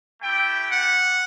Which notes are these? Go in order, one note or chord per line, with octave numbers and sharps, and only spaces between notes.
A3 E4 G4 G5
F#5